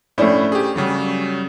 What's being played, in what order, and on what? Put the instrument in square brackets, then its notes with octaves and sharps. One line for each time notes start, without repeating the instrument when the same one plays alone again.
[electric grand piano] A2 E4 C5 [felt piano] A3 C#4 D4
[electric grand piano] G4 G#4
C#3 F#3 G3